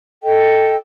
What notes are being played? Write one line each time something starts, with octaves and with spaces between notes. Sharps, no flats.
A4 D#5 G5